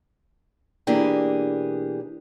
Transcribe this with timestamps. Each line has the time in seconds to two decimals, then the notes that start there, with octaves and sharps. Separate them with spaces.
0.87 B2 E3 A#3 D4 G4 G#4